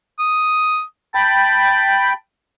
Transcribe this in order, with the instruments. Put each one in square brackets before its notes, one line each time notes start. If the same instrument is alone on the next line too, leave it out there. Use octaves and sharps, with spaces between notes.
[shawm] D#6
[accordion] G5 B5 [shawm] A5